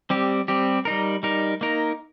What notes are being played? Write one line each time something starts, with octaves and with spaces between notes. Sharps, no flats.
G3 C4 G4
G3 C4 G4
G3 D#4 A#4
G3 D#4 A#4
A#3 D#4 A#4